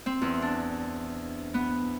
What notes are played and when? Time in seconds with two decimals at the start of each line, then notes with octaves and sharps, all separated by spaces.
0.06 C4
0.22 E2
0.42 D4
1.54 B3